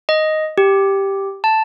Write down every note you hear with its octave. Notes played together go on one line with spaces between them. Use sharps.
D#5
G4
A5